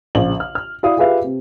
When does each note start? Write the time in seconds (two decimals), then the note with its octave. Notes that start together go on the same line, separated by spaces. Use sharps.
0.15 A#1 C#3 F#7
0.40 F6
0.55 F6
0.83 E4 F#4 D5 F5 D#6
0.97 F4 G4 G#4 B4 E5 F5
1.24 C3